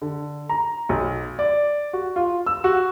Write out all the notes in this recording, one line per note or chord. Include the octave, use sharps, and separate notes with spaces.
D3
A#5
B1
D5
F#4
F4
E6
F#4